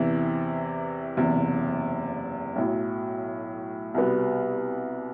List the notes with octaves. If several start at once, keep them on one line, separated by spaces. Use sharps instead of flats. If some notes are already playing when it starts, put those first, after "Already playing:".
Already playing: E2 C3 E3
F#1 E2 C3
B1 A2 F#3
C2 B2 G3 B3